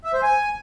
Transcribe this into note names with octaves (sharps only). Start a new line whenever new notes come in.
E5
C5
G#5